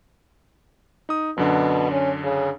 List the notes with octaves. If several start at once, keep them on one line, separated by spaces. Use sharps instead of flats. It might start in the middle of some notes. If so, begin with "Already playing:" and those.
D#4 D#6
F#2 B2 D3 D4
C#4
C#3